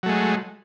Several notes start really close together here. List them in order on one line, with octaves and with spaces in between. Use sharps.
F#3 A3 G#3